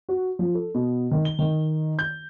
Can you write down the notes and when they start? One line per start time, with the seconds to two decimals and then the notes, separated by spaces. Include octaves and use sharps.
0.09 F#4
0.39 F3
0.54 A4
0.75 B2
1.11 D#3
1.25 G7
1.39 D#3
1.99 G6